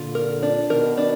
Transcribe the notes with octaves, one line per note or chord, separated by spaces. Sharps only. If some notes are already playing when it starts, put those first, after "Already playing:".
Already playing: A#2 D3 F4
A#4
D4
B2 D#3 A#4
D4